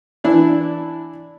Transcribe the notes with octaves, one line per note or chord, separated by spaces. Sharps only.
E3 D4 E4